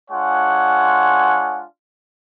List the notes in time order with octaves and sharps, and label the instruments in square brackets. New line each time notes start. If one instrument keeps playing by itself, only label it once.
[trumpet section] G#3 D4 F4 C#5 F#5 G#5